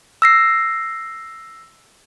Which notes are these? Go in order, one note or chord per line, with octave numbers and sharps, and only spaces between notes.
E6 A#6 C7